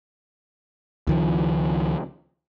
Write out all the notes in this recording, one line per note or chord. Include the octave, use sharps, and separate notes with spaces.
C#2 D#3 F3